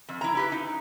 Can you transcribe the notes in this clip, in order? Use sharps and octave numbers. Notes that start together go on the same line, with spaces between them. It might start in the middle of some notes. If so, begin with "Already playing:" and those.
F2
E4 A#5
E4 G4 B4
D#4